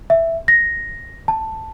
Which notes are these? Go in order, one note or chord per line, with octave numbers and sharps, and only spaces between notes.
E5
A#6
A5